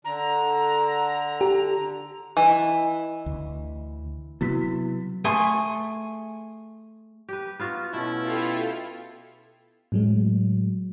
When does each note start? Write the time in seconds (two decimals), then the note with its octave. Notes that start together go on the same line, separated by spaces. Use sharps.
0.05 D3 A#5
1.41 G4
2.37 E3 D#5
3.26 D2
4.41 C3 F#3 B3 E4 F#4 B6
5.24 A3 G#4 G#5 C6
7.29 G4 B4
7.59 B3 F4 F#4
7.93 B2 A3 C#4 E4
8.23 F4 G4 A4
9.92 A2 F#3 G#3